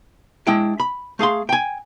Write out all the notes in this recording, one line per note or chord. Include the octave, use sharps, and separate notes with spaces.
G#3 D4 E4 G5
B5
A3 G#4 F5 C6
G5 G#5